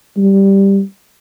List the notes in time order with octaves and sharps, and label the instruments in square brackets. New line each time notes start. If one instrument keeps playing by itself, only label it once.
[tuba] G3